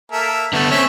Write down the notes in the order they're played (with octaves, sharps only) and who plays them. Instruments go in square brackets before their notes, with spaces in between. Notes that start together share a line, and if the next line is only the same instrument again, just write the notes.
[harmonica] A#3 A4 E5
[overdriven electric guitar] D3 B3 [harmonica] A3
[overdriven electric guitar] C4 C#4 [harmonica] C#5 E5